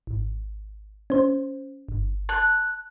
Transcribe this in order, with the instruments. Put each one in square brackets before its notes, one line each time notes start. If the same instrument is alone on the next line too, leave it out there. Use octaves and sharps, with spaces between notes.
[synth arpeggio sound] G#1
C#4 C5
G1
[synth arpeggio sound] A5 [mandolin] F#6